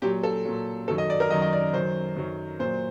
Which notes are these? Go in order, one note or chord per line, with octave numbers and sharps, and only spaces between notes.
A#2 F#3 G4
A4
A#2 F#3
F#2 D#3 F#3 A4
D#5
D5
A#4
F#2 D#3 F#3 D#5
D#5
D5
F#2 D#3 F#3 C5
F#2 D#3 F#3
A#2 F#3 C5